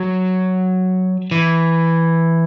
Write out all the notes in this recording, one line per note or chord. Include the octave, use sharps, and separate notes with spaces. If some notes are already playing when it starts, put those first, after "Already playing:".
Already playing: F#3
E3